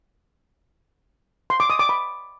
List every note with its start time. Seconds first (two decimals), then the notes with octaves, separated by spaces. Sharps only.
1.50 C6
1.60 D6
1.70 D#6
1.79 D6
1.89 B5